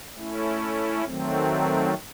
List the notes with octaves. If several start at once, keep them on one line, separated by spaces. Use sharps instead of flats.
A3 C#4 E4
D#3 F#3 A3 C4